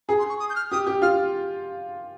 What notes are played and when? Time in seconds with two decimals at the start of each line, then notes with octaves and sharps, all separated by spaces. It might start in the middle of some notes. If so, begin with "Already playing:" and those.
0.09 G#4 A#5
0.19 C6
0.29 C#6
0.40 D#6
0.50 G6
0.55 F6
0.71 G4 D#6
0.87 G4
1.02 F4 F6